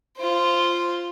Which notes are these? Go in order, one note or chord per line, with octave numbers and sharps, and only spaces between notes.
F4 C5